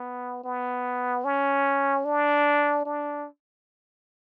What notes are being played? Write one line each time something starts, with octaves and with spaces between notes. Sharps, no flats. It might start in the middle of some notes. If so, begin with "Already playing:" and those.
Already playing: B3
B3
C#4
D4
D4